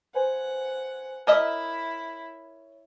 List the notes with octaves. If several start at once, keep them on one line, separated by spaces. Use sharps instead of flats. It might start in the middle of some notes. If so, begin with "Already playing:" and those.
B4 C5 F#5 G#5
E4 A#4 C#5 D#5 E5 B5